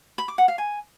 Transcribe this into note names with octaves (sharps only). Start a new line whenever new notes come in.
B5
D6
F#5
F5
G#5